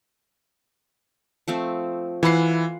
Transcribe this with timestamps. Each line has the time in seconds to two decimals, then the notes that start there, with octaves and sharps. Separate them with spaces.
1.48 F3 A3 C4
2.23 E3 F4 F#5 B5 C7